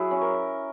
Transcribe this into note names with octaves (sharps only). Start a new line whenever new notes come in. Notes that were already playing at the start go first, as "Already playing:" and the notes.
Already playing: F#3 E4 G#4
C#4
A#4